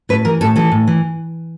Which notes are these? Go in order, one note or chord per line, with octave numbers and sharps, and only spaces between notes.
A2 B4
E3 A#4
A2 A4
E3 A4
A2
E3